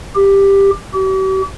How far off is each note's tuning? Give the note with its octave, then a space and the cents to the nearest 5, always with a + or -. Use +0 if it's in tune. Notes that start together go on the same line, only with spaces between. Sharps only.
G4 +10
G4 -45